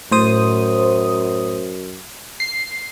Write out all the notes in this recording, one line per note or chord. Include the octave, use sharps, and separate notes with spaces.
F#2 A2 C5 D#6
C7